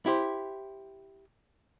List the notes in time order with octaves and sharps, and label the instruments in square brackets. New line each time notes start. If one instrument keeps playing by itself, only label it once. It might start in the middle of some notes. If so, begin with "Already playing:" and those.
[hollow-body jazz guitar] E4 G4 C5